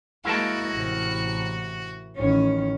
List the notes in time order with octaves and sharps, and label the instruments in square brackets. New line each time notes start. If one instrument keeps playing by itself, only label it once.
[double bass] G#3 A#3 [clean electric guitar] E4 A#4 A5 [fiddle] F#4
[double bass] A1 C3
[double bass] A1 D#3 [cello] C#4